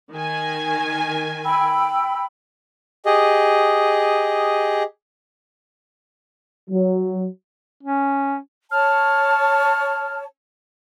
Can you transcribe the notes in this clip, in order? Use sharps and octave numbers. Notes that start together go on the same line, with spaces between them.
D#3 G#5
G5 B5 E6
G4 G#4 D#5
F#3
C#4
C#5 A5 F6